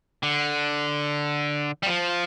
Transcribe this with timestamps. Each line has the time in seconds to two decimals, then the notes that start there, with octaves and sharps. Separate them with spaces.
0.23 D3
1.83 G3
1.87 F3